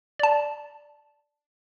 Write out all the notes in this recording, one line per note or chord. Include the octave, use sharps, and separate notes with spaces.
D5 A5